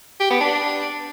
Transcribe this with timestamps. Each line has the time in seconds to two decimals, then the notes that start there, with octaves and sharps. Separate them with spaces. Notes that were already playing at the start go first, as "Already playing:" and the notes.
0.21 G4
0.31 B3
0.41 D4